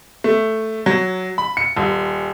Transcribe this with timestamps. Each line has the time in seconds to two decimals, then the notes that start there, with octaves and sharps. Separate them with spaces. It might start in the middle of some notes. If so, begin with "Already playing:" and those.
0.24 A3
0.86 F#3
1.38 B5
1.57 C#7
1.76 D#1